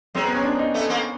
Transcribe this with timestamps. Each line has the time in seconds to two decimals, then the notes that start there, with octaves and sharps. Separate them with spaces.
0.15 F#3 G#3 C4
0.25 B3
0.34 C#4
0.44 D4
0.59 D#4
0.74 A3 B3
0.89 A#3 C4